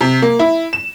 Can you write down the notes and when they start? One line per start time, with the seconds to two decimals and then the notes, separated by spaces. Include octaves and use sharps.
0.01 C3
0.22 A#3
0.39 E4
0.73 E7